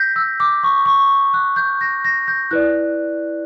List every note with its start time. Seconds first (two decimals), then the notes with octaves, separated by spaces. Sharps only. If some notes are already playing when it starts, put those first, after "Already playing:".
Already playing: G6 A#6 B6
0.16 E6
0.40 D6
0.63 C#6
0.86 C#6
1.34 F#6
1.56 G6
1.81 A#6
2.05 A#6
2.28 G6
2.51 E4 B4 D5 F#6